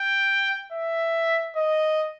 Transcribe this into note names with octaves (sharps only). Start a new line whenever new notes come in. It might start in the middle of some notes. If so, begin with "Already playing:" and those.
Already playing: G5
E5
D#5